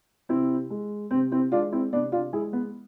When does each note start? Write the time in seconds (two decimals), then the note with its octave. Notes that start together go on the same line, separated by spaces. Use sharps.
0.29 C3 C4 E4
0.70 G#3
1.11 C3 C4
1.32 C4 E4
1.52 G#3 D4 F4
1.72 C4 E4
1.93 C3 B3 D4
2.12 D4 F4
2.33 G#3 E4 G#4
2.53 B3